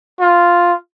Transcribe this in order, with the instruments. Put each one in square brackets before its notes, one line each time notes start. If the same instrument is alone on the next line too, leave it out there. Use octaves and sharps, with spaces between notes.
[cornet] F4